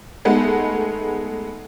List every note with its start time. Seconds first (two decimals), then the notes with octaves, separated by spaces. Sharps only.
0.25 G#3 A3 B3 D#4